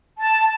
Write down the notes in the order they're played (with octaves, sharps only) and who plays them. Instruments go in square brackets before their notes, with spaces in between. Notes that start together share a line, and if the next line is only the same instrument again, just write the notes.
[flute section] A5